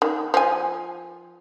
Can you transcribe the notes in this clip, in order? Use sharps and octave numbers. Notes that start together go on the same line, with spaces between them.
D#3
F3 G#5